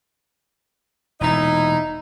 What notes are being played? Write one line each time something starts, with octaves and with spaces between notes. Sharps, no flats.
E1 A#2 D#4 E4